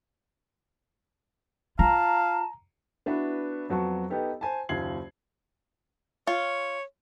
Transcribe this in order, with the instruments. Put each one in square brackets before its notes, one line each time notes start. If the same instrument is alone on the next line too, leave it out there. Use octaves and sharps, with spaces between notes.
[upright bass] F4 [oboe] F5 [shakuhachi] A5 [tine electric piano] A#5
[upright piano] B3 D4 E4 F#4 B4
F2 F#3 B3 F#4 A5 C#6
B3 D#4 G4 A4
C5 G#5 A5
F#1 D#2 F4 G#6 C7 F#7
[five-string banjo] F4 [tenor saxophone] C#5